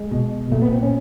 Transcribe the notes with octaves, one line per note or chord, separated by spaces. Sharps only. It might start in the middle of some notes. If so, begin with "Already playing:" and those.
Already playing: G#3
B2
A#2 A3
B3
C4
C#4